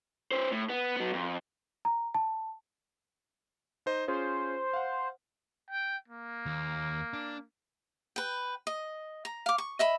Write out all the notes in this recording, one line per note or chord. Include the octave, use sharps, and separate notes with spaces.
C#4 C5
A2
B3
F#3 B3
F2
A#5
A5
D#4 C5 D#5
C#4 F4 G#4 C5
F5 F#5
G5
A#3
D#2
D4
B4 G5
D#5
A#5
F5 D6
C#6
D#5 E5 B5